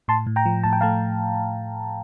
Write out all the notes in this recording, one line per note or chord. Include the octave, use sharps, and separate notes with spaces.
A2 A5 C6
A2
G5 A#5
F3
A2 A5
G5
A3 F5 A5